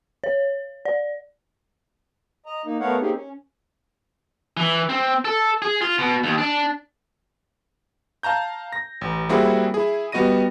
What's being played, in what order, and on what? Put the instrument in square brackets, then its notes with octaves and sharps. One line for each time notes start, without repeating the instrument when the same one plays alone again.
[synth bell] C#5
D5
[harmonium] D#5 A#5
A#3 D#4
A3 B3 A#4 C#5 F5 F#5
A#3 C4 C#4 D#4 G4 G#4
C#4
[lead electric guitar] E3
C4
A4
G#4
F4
B2
D#2
D4
[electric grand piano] F5 A5 A#5 G6
A#6
A1
G3 A#3 C4 E4 F#4 G#4
E4 G#4
G3 B3 F#4 D#5 A#6 D#7